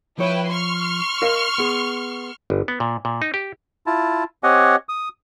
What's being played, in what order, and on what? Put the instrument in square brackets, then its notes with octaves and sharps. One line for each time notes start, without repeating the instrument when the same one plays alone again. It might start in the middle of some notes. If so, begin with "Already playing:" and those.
[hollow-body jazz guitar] F3 C#5 [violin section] E4 B4 G5
[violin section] C6 C#6 F6
[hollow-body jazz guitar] A#4 D#5 F5
B3 G#4
[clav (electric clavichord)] G1
B3
A#2
A#2
D#4
G4
[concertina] E4 F4 A5
C4 G4 C#5 D#5 F#5 G#5
D#6